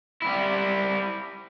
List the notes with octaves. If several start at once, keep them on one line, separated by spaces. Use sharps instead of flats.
G3 E4